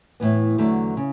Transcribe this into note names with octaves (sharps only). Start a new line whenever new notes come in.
A2 E3 B3
E2 D3 F#3 A3
C#3